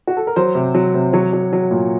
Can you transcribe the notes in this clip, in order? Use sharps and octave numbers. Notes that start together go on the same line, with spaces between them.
F#4
A4
A#4
F#3 C5
C3
F#3
C3
F#3 C#5
F#3
F#3
A#2